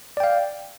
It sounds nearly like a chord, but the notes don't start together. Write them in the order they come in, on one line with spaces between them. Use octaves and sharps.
D5 G5 F5